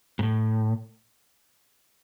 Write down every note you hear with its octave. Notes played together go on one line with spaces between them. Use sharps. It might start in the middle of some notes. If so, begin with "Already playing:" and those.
G#2
A2